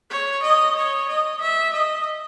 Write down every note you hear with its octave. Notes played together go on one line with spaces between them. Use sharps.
C#5
D#5
C#5
D#5
E5
D#5